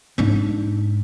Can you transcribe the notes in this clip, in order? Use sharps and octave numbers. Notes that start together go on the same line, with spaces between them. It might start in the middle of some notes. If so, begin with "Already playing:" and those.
G#2 D4